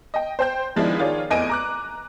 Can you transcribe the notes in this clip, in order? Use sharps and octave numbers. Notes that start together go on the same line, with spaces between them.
D#5 G5
C5 G5 G6
D#3 F3 G#3 B3 D4 E4
D#3 F4 G#4 C#5 D5
F1 E2 D#5 G#5 D7 D#7
A#5 D6 F#6